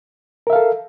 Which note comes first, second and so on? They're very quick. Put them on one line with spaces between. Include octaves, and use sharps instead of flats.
A#4 E5 F5 A4